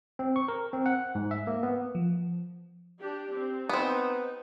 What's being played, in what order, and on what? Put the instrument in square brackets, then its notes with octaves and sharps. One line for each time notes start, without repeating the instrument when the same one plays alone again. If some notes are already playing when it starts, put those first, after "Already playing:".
[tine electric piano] C4
C#6
A#4
C4
F#5
G#2
E5
A#3
B3
[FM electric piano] F3
[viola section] D4 G4
C4
[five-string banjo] B3 C4 [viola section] D#4